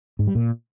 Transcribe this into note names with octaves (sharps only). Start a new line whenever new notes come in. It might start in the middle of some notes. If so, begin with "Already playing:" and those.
G#2
G3
A#2